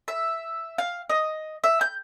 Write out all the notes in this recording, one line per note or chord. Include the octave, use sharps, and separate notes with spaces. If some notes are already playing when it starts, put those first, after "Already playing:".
E5
F5
D#5
E5
G6